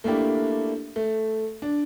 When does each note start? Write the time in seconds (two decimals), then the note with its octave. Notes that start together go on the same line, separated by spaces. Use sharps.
0.04 A3 A#3 D4 E4 G4
0.96 A3
1.62 D4